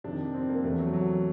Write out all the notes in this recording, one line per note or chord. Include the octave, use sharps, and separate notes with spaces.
F2 C3 D#3 D4
C4
A#3
E2 C3 E3 A3
F#3
F#3